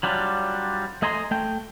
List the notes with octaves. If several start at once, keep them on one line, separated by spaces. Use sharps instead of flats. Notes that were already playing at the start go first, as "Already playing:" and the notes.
F#3 G3 D4 F4
A3 D#5 G#5 A#5 C6
A3 G5